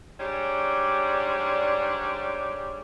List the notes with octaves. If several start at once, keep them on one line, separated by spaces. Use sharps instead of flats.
G#2 G3 D4 C#5 D5